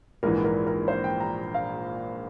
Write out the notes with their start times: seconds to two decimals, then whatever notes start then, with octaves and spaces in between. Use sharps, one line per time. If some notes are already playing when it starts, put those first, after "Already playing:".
0.23 A#1 G#2 E3 A#4
0.44 A#4
0.67 A#4
0.88 C5
1.04 G5
1.20 A#5
1.54 F5